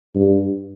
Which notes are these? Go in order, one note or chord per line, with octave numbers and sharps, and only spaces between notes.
G2